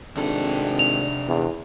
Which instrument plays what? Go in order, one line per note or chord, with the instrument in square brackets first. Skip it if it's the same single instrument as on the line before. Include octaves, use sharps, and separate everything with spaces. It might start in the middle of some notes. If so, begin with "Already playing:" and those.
[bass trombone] G#1 [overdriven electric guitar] C3 A4 [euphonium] D4
[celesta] F7
[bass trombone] E2